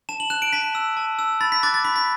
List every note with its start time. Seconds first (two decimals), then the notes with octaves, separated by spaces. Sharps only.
0.09 A5 E7
0.20 F#7
0.30 F#6 E7
0.42 D7
0.53 A5 B6
0.75 E6
0.97 A5
1.19 E6
1.41 B5 A6
1.52 B6
1.63 D6 F#6 A6
1.74 A6
1.85 B5 B6
1.96 B6